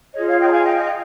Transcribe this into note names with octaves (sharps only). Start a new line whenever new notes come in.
F4 G#4 C#5 D#5
C#5 F5
D#5 G5
A#5
F5 G#5
D#5 G5
D#5